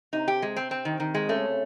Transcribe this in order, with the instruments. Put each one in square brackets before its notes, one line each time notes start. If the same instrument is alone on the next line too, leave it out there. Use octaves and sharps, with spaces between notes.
[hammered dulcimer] C3 [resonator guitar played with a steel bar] D#4
[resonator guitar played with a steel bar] G4
G#3
C4
C4
D#3
D#3
G#3
[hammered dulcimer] C#3 [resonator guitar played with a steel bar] A3